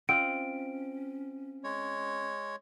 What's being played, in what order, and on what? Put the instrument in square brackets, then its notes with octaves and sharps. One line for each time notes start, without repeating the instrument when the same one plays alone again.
[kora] C4 F4 D#5 [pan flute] C#4 [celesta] D7
[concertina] G#3 C#5